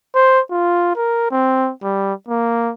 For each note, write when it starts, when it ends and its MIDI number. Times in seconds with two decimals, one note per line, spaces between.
0.15 0.40 72
0.51 0.92 65
0.96 1.27 70
1.31 1.72 60
1.83 2.13 55
2.28 2.72 58